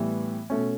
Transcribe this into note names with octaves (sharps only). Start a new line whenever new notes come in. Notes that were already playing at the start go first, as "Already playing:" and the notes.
Already playing: A2 E3 G3 B3
B2 A3 C#4